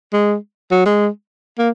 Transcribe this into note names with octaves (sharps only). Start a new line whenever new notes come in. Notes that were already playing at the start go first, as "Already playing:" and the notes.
G#3
F#3
G#3
A#3